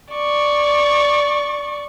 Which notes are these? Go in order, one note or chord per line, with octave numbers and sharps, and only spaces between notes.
D5 C#6